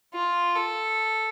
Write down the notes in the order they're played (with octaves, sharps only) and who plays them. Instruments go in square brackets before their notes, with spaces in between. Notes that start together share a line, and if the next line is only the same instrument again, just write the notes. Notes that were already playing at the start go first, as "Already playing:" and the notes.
[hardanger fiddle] F4
A4